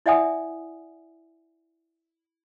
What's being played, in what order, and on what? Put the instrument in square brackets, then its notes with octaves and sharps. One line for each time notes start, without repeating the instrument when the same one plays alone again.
[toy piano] E4 D5 E5 F#5 G#5 D#6